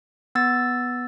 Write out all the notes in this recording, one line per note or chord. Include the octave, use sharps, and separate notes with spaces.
B3 E6 A6